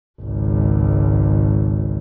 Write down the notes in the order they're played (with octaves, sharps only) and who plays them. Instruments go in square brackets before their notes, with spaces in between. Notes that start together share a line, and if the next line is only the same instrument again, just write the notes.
[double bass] G#1 C#2